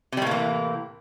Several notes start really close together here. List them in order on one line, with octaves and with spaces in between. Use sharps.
C3 G3 A2 A#3 E3